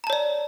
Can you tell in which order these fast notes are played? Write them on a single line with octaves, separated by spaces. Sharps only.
A#5 A5 C#5 D5